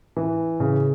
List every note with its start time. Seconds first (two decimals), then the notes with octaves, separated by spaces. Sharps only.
0.17 E3
0.60 C#3